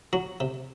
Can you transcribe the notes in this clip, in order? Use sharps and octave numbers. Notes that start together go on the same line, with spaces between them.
F#3 F#4
C3